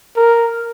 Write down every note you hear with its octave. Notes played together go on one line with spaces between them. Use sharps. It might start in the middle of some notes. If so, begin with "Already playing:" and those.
A#4